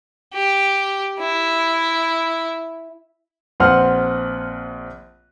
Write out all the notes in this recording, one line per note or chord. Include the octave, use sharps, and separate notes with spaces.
G4
E4
A#1 C4 B4 F#5 C6 F6